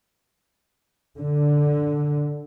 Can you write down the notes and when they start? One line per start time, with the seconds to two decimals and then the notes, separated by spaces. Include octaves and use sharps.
1.20 D3